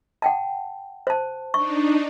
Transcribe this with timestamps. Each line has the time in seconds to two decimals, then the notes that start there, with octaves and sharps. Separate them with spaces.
0.22 F#5 G5 A5
1.07 C5 A5
1.54 D4 D#4 C#6